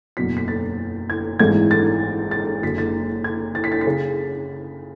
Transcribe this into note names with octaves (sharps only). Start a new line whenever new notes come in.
F#1 E2 B2 F#3 B6
B6
A6
G#6
G#1 G#2 E3 A3 G#6
A6
A6
F#1 F#2 D3 G#3 B6
A6
G#6
A6
B6
A6
B6
C#3